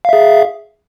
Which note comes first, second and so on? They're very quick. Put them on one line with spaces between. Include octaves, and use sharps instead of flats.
F5 E5 G#4